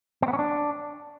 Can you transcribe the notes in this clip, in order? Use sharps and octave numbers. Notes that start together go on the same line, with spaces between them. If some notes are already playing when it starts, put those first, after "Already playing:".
C4
B3
C#4
D4